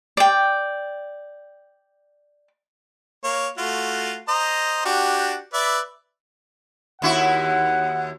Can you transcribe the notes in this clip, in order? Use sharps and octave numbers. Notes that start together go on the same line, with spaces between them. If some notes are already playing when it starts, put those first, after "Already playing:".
D5 G5
A#3 C#5
A3 F4 F#4
C5 D#5 A#5
D4 F#4 G4
B4 D5 E5
D#2 E4 F#4 F#5